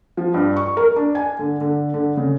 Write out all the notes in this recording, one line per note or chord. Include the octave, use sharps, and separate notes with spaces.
F3
G2
C#6
A#4
D4
G#5
D3
D3
D3
C#3